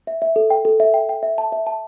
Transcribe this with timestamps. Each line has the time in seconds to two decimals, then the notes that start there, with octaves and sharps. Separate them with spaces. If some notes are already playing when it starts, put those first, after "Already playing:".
0.07 E5
0.22 E5
0.36 A4
0.50 G5
0.65 A4
0.80 E5
0.94 G5
1.09 G5
1.23 E5
1.38 A5
1.52 E5
1.67 A5